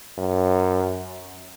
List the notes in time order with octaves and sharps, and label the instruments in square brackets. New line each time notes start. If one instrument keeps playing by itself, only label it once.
[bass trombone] F#2